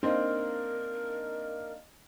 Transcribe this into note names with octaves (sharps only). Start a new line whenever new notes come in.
A#3 C4 D4 D#4 A#4